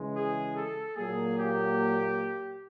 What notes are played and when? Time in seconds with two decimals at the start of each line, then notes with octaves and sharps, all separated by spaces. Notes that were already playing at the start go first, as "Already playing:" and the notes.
Already playing: C#3 E3 G#3
0.15 G#4
0.56 A4
0.97 A#2 F#3 A#3 G#4
1.39 G4